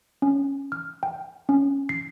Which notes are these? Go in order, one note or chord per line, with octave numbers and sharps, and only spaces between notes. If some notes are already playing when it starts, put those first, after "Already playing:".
C#4
F6
G5
C#4
C7